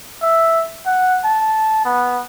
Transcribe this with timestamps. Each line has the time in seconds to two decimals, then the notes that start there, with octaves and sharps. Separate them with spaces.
0.22 E5
0.86 F#5
1.24 A5
1.85 B3